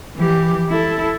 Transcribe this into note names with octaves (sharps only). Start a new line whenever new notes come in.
E3 G4
E4 A4